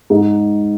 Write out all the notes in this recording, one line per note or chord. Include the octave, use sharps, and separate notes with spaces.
G#2